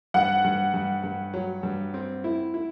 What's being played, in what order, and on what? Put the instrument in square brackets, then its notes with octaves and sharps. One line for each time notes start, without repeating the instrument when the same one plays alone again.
[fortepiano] G2 [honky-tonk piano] F#5
[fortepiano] G2
G2
G2
F#3
G2
C4
E4
E4